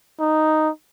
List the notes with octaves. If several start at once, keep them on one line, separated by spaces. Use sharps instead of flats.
D#4